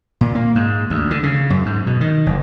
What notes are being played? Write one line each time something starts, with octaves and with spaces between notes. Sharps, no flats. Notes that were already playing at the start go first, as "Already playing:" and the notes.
A#2
A#3
G#2
D2
D3
C#3
F#2
G#2
B2
D#3
F#1